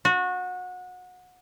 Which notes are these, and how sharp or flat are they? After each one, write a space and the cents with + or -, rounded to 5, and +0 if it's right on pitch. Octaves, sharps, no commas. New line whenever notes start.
F#4 -25